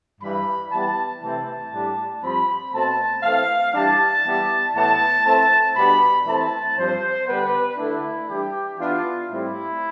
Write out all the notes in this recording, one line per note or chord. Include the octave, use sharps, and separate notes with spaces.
G2 E3 G3 B5
E3 G3 B3 A5
C3 E3 A3 C4 A5
A2 G3 D4
G2 F3 C4 B5
B2 A3 C4 A5
E3 A3 C4 F5
E3 G3 D4 A5
E3 G3 B3
A2 E3 B3 A5
E3 A3 C4 A5
B2 G3 B3 D4 B5
E3 A3 C4 A5
G2 F3 C4 C5
D3 G3 B3 B4
D3 A3 D4 E4
E3 G3 D4 G4
E3 B3 D4 F4
A2 G3 C4 E4